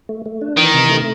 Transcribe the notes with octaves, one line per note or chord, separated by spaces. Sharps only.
A3
A3
D4
D#3 E3
C3
A3